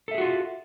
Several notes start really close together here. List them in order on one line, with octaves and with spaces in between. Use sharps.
A4 E5 G#4 F#4 F4